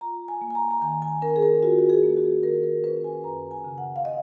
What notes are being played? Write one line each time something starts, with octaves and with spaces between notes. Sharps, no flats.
F4 A#5
G#5
A#3
G#5
A#5
A#5
D#3 G#5
G#5
C#4 A#4
G#4
A#4
F4 F#4
F#4
G#4
A#3
F#4
D#3 A#4
A#4
C#4 B4
G#5
F#2 A#5
G#5
C#3
F#5
F5
D#5